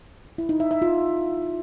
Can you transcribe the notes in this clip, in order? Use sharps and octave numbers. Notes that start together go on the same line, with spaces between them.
E4
D#4
E5
E5
F4